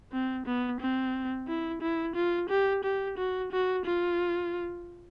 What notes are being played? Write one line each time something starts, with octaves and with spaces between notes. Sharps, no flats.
C4
B3
C4
E4
E4
F4
G4
G4
F#4
F#4
F4